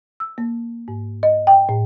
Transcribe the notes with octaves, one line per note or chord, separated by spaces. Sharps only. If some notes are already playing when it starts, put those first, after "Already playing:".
E6
A#3
G#2
D#5
G5
A2